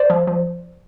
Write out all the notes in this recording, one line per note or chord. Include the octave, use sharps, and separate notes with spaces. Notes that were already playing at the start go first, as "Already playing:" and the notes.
Already playing: C5 D5
F3
F3